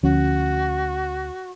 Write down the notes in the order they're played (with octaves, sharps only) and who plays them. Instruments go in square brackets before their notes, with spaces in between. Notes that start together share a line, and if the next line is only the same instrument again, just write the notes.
[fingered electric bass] D2 F3 C#4 [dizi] F#4